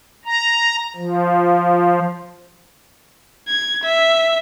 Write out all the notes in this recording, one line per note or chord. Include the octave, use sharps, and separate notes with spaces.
A#5
F3
G#6
E5